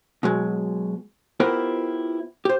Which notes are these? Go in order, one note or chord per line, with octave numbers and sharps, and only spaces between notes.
B2 F#3 G#3
B3 E4 F4 G4 A#4 C5
G4 C5